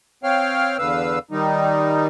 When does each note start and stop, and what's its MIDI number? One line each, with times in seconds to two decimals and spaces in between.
0.24 0.77 60
0.24 0.77 73
0.24 0.77 77
0.24 0.77 79
0.24 0.77 89
0.78 1.19 40
0.78 1.19 50
0.78 1.19 71
0.78 1.19 77
0.78 1.19 88
1.31 2.08 51
1.31 2.08 55
1.31 2.08 63